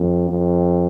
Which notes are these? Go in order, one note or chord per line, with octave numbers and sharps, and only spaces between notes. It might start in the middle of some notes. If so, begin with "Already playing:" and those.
Already playing: F2
F2